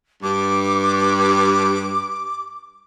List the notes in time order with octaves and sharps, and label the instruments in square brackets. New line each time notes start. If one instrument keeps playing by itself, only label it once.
[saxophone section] G2 [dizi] D6